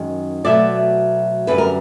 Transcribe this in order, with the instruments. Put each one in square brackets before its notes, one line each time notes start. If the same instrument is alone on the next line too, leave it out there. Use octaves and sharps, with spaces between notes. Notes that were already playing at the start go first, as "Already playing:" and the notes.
Already playing: [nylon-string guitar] F#2 D#3 G#3
B2 F#3 A3 D5 E5
F#2 D3 G3 B4
A#4